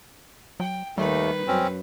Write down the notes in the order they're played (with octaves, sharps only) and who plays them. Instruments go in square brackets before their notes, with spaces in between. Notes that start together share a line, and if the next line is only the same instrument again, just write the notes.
[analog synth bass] F#3 [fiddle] G5
[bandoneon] D#2 A3 [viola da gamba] D#3 [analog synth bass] G3 [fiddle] B4
[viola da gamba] F#2 [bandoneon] C4 C#4